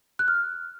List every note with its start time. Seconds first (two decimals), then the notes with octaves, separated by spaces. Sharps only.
0.19 F#6
0.28 F6